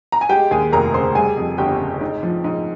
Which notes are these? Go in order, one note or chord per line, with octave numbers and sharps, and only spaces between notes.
A#5
G#5
G#3 G4 G5
D#2 G#4 G#5
F1 A#4 A#5
C#3 C5 C6
G3 G#4 G#5
F2
G1 G4 G5
C#3
G#2
F3
G#2